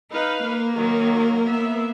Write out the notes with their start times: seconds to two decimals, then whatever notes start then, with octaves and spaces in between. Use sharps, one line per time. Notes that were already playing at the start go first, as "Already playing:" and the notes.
0.12 D#4 B4 F5
0.45 A#3
0.76 D#3 F#3 A#4
1.45 B3 E5